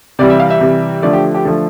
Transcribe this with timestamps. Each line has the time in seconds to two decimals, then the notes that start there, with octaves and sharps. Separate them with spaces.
0.19 C3 E3 G3 D5
0.30 E5
0.40 F5
0.50 E5
0.61 C3 E3 G3
1.02 D3 F3 A3 D5
1.13 G4
1.34 G4
1.45 D3 F3 A3 A4